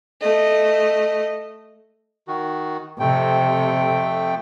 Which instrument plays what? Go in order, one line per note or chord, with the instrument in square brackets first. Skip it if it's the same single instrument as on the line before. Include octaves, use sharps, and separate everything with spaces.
[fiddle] A3 D#5
[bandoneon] D#3 F#4
[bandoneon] F2 A3 G5 [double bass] C3